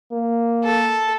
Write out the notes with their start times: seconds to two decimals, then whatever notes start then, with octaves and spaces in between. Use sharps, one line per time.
0.12 A#3
0.64 A4